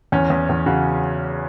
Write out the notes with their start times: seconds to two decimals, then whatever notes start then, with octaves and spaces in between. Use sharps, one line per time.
0.12 E2 C#4
0.30 E2
0.49 E2
0.66 C#3 F#4